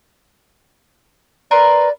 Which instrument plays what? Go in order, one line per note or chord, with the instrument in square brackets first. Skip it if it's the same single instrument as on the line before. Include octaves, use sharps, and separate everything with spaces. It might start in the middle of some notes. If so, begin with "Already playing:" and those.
[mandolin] A#4 B4 C6 [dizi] D5